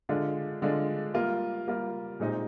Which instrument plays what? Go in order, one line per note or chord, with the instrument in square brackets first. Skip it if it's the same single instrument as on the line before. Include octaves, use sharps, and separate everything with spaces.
[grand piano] D3 G#3 D4 F4
D3 G#3 D4 F4
G3 A#3 F4
G3 A#3 F4
A#2 G#3 C4 D#4 G4